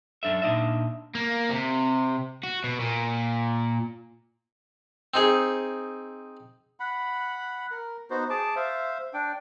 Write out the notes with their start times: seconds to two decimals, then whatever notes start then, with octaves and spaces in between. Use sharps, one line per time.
0.23 F#2 D4 A4 E5
0.42 A#2 D4 D#4 D#5 E5
1.15 A#3
1.49 C3
2.43 F#4
2.64 B2
2.80 A#2
5.14 C4 D#4 G#4
6.80 F#5 B5
7.71 A#4
8.10 B3 D#4 F#4 C5
8.30 G#4 A5 D6
8.56 C5 E5 F5
9.14 D4 G5